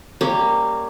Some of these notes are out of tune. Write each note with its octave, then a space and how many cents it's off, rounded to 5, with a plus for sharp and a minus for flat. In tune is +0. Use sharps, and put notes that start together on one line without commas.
G3 +0 A#3 -15 C#4 +0